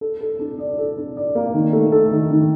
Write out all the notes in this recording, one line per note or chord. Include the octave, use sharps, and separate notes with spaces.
A4
A4
D4
D5
A4
D4
D5
A#3
D#3
A3
A4
D#3
D#3